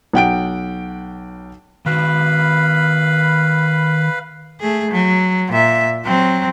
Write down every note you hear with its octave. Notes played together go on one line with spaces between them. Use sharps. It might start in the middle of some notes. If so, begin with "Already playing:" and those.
B1 F#5 G5 D7
D#3 F#4 B4 F5 B5
A3 G#4
F#3
A#2 E5
F#3 C4